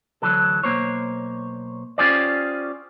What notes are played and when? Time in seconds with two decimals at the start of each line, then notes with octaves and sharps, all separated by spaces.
0.22 D2 E3 F#3 A4
0.63 B1 A#3 C5 C#5
1.98 C#4 F4 G4 G#4 C5 D5